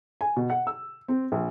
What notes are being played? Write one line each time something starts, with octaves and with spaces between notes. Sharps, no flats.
G#5
B2
F#5
E6
C4
A#1